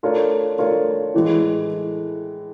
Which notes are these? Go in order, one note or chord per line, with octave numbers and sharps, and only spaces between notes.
A3 D4 F4 A#4 C#5
A3 D4 F4 A#4 C#5
A2 E3 G#3